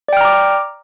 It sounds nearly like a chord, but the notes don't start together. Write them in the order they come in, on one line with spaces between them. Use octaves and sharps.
D5 G5 F6 A#5 D6